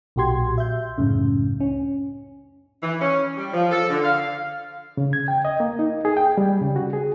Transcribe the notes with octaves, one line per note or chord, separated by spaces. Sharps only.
B1 A#2 F#4 G4 C6 G#6
E5 G6
C#2 F#2 A2 C#3
C#4
E3
C#4
G3
F3
A4
D3
F5
C#3
G#6
G5
D#5
A#3
D#4
G#4
G5
G3
C#3
F#4
G#4